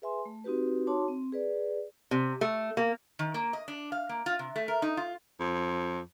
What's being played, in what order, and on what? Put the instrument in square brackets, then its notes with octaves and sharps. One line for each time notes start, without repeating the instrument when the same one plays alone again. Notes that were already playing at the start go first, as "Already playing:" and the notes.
[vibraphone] G#4 B4 E5 G#5 C6
A3
C4 D#4 F#4 G4 B4
D#4 F#4 C#5 A5 C6 D6
C4
G#4 B4 D5
[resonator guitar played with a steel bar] C3
A3
A#3
D#3
A#3
D#5
D4
F5
A#3
F4
C3
A3
A#4
D#4
F4
[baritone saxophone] F2